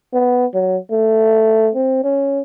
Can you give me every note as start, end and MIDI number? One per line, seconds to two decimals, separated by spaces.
0.13 0.46 59
0.54 0.77 54
0.91 1.70 57
1.75 2.03 60
2.04 2.42 61